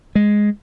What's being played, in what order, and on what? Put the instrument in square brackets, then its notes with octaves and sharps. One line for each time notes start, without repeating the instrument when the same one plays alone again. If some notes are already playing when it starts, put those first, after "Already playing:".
[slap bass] G#3